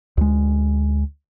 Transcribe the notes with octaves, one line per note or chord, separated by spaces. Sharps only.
D2 G#3